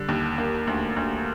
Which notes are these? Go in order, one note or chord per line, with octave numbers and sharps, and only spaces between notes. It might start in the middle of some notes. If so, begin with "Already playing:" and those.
Already playing: D3 G3
D#2
A#3
D2
D2